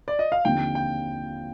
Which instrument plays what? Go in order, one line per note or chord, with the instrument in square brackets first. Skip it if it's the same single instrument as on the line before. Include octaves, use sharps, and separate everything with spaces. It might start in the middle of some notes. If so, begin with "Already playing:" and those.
[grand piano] D5
D#5
F5
[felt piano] D#2 D3 F3 C4 [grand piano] G5
[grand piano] G5